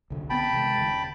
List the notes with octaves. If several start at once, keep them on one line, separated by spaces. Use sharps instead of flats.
C2 D3
A#1 B3 C4 G5 A5 B5
C3 D#3 G#3
D#1 C#3